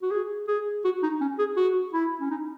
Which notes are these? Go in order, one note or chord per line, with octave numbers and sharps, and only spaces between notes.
F#4
G#4
G#4
F#4
D#4
C#4
G#4
F#4
E4
C#4
D#4